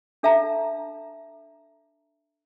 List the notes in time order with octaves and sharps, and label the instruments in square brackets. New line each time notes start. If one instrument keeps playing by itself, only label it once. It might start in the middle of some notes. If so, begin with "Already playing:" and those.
[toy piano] D4 A4 E5 F5 A5 A#5